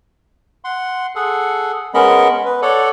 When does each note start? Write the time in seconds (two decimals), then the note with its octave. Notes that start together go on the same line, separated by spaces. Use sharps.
0.64 F#5 C6
1.15 G#4 A4 F#5
1.94 G#3 B3 C#4 A#4 D#5 B5
2.46 B4
2.62 A4 C#5 D5 F#5